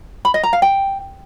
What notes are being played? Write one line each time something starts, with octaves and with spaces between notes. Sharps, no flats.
B5
D#5
A#5
F5
G5